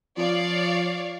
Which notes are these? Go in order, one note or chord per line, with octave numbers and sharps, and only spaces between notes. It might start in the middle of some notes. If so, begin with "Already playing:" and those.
F3 C#5 D5 F5